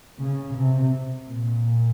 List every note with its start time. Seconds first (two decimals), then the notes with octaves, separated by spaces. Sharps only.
0.19 C#3
0.55 C3
1.27 A#2